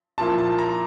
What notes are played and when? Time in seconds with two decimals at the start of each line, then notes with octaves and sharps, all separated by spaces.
0.18 A#2 F3 A#3 E4 A5
0.38 A5
0.58 A#5